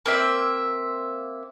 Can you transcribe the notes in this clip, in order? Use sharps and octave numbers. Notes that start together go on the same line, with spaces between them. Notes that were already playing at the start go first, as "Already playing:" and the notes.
A#3 C4 E5